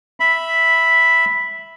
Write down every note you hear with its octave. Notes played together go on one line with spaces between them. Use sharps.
E5 B5